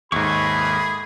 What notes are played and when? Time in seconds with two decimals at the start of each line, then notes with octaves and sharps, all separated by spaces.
0.12 D#2 G#2 G#4 A4 E5 B5 C#6